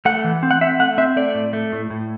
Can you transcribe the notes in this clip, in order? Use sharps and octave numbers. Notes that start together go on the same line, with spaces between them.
A3 F#5
E3
C4
F#5
C4 E5
A3 F#5
C4 E5
A3 D5
A2
A3
A2
A2